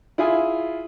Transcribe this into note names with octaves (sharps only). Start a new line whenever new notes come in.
E4 F4 G#4 G#5